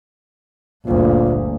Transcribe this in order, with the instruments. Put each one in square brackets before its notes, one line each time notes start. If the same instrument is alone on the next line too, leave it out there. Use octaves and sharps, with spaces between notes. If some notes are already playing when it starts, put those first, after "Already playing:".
[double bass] G1 D2 [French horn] A#2